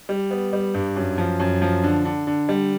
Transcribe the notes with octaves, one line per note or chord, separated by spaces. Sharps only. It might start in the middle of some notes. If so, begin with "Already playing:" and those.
G3
B3
G3
G2
F#2
F3
F#2
F3
D3
D3
D3
G3